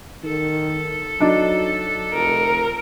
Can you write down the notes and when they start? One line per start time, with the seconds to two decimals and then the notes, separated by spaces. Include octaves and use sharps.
0.23 D#3 A4
1.21 F#3 D4 D#4
2.13 F1 A#4